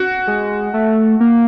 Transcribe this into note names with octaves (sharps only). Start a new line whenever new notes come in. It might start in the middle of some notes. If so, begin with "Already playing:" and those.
Already playing: F#4
G#3
A3
A#3